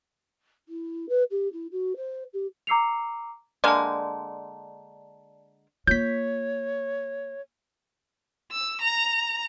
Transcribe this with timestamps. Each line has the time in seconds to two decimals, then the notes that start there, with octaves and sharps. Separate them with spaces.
0.68 E4
1.09 B4
1.31 G4
1.52 E4
1.71 F#4
1.96 C5
2.33 G4
2.67 A#5 D6 E6 C7 C#7 F7
3.64 D3 G#3 A#3 D5 A5
5.87 A#3 F4 C#5 G6 B6
8.51 E6
8.81 A#5